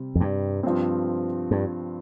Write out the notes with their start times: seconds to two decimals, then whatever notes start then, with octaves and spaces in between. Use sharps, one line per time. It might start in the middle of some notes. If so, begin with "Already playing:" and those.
Already playing: C3 G3 C4
0.15 F2
0.21 G2
0.63 G2 F3 C4
1.51 G2